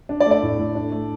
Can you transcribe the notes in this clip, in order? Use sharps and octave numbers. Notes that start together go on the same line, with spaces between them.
D4
D5
A3
D5
A2
A2
D4
A3